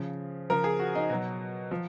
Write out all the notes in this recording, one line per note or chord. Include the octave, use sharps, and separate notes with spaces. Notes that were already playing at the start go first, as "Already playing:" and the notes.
Already playing: C#3 F3
C#3 F3 A#4
G#4
F#4
D#4
B2 F#3
F3